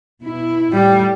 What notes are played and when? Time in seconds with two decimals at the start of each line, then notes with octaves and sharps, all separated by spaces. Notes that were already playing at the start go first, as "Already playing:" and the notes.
0.21 B2 E4
0.72 A2 G3 G4